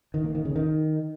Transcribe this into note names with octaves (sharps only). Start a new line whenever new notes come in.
D#3
A#3
D#3
C#3
D#3